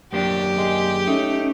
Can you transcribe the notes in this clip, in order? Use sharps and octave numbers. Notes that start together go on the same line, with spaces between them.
F#2 A#3 D4 G4
G#3
A3 C#4 D#4